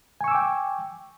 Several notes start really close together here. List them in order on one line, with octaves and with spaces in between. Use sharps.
G#5 C#6 E6 D6 G5